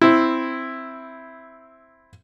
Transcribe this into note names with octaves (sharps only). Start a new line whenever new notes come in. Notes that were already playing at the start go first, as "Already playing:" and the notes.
C4 E4